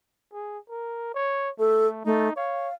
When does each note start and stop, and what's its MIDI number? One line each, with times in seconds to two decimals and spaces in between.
0.33 0.58 68
0.70 1.12 70
1.15 1.50 73
1.59 2.02 57
1.59 1.87 69
2.05 2.29 57
2.05 2.34 63
2.36 2.69 73
2.36 2.74 77